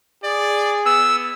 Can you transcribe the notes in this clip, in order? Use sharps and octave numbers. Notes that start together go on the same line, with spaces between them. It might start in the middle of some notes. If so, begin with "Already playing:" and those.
G#4 D5
B3 E6